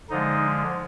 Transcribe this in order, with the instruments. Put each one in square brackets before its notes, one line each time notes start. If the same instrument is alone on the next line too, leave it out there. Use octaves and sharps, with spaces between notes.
[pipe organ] D3 F3 G#3 D#4